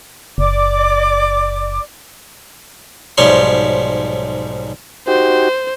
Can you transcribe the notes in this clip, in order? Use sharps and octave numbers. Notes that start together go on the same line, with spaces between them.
F#1 D5 D6
B1 G#2 F3 G3 C#5 C6
D#4 F#4 G4 C5